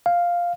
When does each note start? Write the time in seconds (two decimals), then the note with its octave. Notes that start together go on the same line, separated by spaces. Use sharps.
0.06 F5